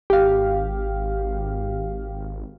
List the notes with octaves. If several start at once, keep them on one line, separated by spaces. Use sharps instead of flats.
G#1 G4 F5